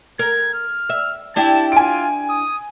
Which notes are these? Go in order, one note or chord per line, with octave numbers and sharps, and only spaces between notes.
A#4 G#6
F6
E5
D4 E4 G4 A5
F4 G#5 D7
D#6